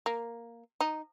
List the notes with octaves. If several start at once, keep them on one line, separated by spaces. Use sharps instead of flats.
A#3
D#4